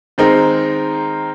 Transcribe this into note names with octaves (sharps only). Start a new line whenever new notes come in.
D#3 G#3 C4 D#4 A#4